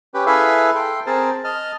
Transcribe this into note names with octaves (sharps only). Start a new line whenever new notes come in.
C#4 G4 B4
E4 G#4 A4 B4 E5 F5
A4 G5 C6
C4 G#4 A#4 C5 A5
D#5 A5 F6